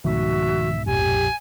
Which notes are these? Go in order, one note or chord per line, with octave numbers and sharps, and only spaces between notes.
C2 G#2 B2 D#3 F3 A3 F#4 E5
A#1 F2 G4 G#5